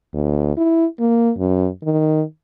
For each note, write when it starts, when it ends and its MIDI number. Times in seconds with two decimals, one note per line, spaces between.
0.14 0.55 38
0.57 0.85 64
0.99 1.31 58
1.38 1.68 42
1.83 2.22 51